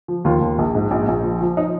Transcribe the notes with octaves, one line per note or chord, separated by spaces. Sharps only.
F3
D#2 F4
D#2
A#1
G#2
A#1
A#1
F3
F3
D#4